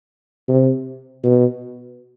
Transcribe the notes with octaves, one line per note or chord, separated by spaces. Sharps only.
C3
B2